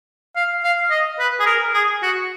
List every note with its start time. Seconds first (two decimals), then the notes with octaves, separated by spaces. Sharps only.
0.36 F5
0.63 F5
0.91 D#5
1.19 B4
1.40 G#4
1.46 A#4
1.74 G#4
2.03 F#4